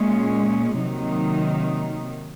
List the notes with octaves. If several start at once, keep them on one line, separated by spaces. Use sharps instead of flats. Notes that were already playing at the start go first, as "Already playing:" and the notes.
Already playing: A#2 G#3 C#4
C3 D#3 F#3 A#3 D#4